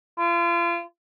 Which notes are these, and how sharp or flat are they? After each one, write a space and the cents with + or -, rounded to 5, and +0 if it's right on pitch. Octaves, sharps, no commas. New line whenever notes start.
F4 -35